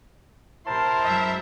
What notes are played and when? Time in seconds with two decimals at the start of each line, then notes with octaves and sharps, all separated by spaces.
0.67 C3 E4 A#4 C5 A5 C6
1.02 F#2 F#3 G#3 E5